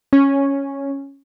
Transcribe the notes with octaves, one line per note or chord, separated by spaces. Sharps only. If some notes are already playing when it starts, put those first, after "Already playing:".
C#4